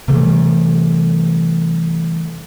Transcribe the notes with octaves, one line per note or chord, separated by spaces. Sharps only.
C3 E3 G3 A3